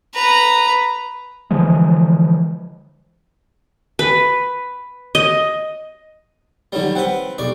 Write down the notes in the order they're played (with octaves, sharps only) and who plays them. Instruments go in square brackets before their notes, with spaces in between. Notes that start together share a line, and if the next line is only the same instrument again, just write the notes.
[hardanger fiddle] B4 A#5
[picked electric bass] D3 E3 F3 G#3
[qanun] B4
D#5
[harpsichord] D3 F#3 G3 [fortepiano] D#3 C#5
[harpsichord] C4 B4 [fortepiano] F#5
[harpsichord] B1 D5 C#6 [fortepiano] G4